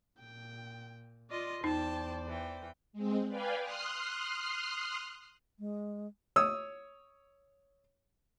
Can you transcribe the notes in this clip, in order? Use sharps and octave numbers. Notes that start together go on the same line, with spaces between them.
A#2 G5
F4 D5 D#5 C6
E2 D#4 C5 D5 G5 A5
E3 G5
G#3 C4
B4 D5 F5 G5 G#5
C6 D#6 F6 F#6 C7
G#3
C#5 D#6 E6